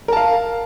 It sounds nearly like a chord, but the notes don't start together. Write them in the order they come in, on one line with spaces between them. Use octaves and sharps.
A#4 A5 F5